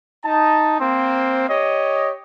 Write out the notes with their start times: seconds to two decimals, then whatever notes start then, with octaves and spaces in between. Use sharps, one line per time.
0.25 D#4 A5
0.79 A#3 C4 C5
1.49 G4 C#5 D#5